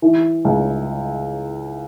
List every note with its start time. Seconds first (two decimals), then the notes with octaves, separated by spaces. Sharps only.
0.02 E3
0.45 C#2